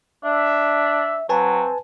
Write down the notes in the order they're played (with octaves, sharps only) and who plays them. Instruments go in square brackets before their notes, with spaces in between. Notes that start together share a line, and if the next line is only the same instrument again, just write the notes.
[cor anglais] D4 [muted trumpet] E5
[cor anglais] F#3 [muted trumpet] C4 [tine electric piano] B4 G#5 A5